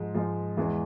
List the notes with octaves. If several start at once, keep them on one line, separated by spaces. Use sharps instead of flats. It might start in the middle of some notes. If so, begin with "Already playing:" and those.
Already playing: G#2 F3 G#3
G#2 F3 G#3
E2 E3 G#3